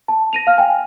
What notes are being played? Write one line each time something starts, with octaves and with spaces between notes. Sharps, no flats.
A5
A#6 D#7 F7
F5 F6
G5 G#5